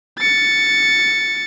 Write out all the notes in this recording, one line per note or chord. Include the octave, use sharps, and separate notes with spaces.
A6 C#7